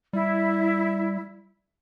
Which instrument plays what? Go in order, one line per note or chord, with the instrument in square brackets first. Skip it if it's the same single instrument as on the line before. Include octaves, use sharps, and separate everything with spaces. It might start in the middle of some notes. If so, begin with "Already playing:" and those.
[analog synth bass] G3 [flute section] E4